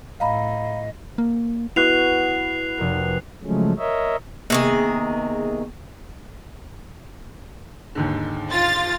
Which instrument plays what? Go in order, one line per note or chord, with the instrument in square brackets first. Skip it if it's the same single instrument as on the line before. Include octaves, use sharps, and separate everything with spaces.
[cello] A2 [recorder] D#5 [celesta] F5 A#5 B5
[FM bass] A#3
[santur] B3 F#4 [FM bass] E4 [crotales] F#6 C7 F7
[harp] F1 A#4
[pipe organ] C#3 F3 F#3 G#3 A3 C#4
A#4 C#5 D#5 E5
[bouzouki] C3 D#3 G#4 [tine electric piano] A#3 B3 C#6
[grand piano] D#2 G#2 D3
[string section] F4 A6